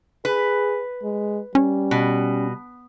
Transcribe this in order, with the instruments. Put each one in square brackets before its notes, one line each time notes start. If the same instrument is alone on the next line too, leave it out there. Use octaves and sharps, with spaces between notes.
[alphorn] G#4 [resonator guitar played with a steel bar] B4
[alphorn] G#3
[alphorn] G3 [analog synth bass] C#4
[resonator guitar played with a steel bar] B2